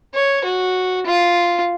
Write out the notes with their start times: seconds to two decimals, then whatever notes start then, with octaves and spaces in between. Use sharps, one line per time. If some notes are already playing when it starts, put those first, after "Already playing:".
0.15 C#5
0.44 F#4
1.06 F4